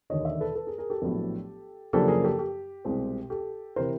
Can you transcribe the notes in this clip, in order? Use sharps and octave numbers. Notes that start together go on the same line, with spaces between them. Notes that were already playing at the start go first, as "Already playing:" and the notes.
E1 D#2 D3 C#5 D#5
D5 E5
A4 B4
A4 B4
G#4 A#4
G#4 A#4
G4 A4
A#1 A2 F#3 B3
F#2 C#3 F3 A#3 D4 G4 A4
G#4 A#4
G4 A4
G4
C2 B2 G#3 C4
G4 A4
C3 E3 A#4 C5